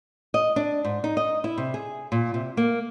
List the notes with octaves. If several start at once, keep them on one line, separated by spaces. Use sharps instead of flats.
D#5
D4
G#2
D#4
D#5
E4
C3
G#4
A#2
C3
A#3